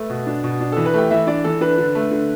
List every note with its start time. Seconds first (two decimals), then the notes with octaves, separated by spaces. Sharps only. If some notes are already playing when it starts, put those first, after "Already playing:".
Already playing: A3 B4
0.10 B2
0.27 D4
0.44 B2
0.61 D4
0.72 E3 A4
0.86 B4
0.94 A3 G4 G5
1.11 E3 E4 E5
1.27 D4 D5
1.44 E3 A4
1.61 D4 B4
1.78 D3
1.95 A3
2.11 D3